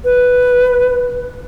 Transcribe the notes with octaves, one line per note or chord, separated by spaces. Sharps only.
B4